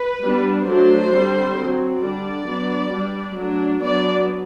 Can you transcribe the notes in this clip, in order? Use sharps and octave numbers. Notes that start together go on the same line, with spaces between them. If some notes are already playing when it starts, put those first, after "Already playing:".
Already playing: B4
G3 B3 D4
F#3 A3 D4 C5
D3 G3 C4
F#3 C4
D3 G3 D4 D5
F#3 B3 D4
G3 D4
F#3 A3 D4
F#3 B3 D4 D5